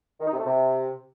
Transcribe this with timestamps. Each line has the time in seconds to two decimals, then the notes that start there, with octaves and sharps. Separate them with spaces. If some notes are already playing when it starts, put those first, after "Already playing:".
0.20 D#3
0.27 D#4
0.33 C3
0.39 A3
0.45 C3